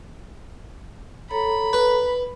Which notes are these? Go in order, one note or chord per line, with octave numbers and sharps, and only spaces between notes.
A4 C#5 A#5 B5
B4